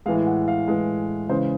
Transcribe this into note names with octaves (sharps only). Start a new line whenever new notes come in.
A2 E3 G#3 F5
F#5
F5
A2 E3 G#3
C#3 E3 G#3 C5